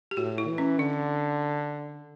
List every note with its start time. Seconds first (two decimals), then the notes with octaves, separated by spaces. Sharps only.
0.11 G4
0.17 A2 F#4
0.38 E4
0.48 E3
0.58 C#4
0.79 D3 D4